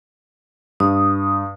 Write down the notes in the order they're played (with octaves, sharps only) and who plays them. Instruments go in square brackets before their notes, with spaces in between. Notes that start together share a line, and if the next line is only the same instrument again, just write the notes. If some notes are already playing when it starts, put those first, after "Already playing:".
[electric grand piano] G2 [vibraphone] D#6